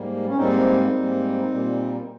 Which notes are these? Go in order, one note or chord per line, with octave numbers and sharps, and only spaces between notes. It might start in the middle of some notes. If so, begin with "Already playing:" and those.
Already playing: G#2 G3 A#3
C#4
G#2 G3 A#3 C4 D#4
G#2 G3 A#3
A#2 G3 A#3